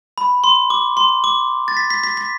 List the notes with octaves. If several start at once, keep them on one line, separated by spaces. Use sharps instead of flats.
B5
C6
D6
C6
D6
A6
B6
B6
B6
B6